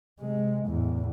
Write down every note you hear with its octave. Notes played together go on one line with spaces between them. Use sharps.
C3 G#3
E2 A2